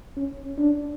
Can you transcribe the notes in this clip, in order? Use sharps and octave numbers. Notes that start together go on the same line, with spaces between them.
C#4
D4